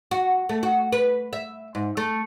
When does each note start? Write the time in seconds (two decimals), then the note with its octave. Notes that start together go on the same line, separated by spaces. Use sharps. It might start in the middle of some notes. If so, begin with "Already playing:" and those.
0.11 F#4
0.49 A3
0.63 F#4
0.92 B4
1.33 E5
1.75 G#2
1.97 A3